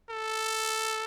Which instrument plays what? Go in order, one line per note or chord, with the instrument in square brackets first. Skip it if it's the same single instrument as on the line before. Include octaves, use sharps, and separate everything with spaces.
[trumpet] A4